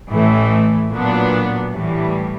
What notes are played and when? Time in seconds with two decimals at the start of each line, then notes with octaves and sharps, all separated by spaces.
0.12 A1 A2 E3 A3
0.94 A#2 F#3 B3 D4
1.75 A2 E3 G3